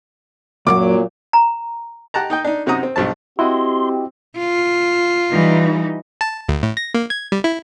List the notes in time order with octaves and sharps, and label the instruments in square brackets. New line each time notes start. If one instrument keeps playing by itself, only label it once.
[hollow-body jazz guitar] C2 F#2 [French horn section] A#2 F#3 [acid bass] A#3 [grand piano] D6
[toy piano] A#5
[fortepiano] G4 F#5 A5 A#5
D#4 D#5 G5
D4 D#4
F#2 C3 D#4 F#4 A#5 D#6
C4
B1 G2 F3 A5
[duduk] C4 [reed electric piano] E4 F#4 D#5 [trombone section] G4 [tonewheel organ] C6
[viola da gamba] F4
[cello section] E3 G3 D#4
[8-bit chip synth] A5
D2
A2
A#6
A#3
G#6
G3
E4